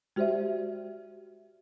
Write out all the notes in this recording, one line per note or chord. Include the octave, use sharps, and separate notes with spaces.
G#3 F#4 G4 C5 D5 E5